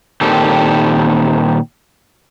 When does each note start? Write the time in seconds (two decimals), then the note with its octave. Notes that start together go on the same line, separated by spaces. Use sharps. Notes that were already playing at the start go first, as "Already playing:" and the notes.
0.21 A#2 D#3 C4 G4 A4